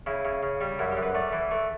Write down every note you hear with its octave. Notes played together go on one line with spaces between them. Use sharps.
C#3 E4
C#3
C#3
G3
F#2 E4
G4
F#2
B4
A3 D5
E3
A3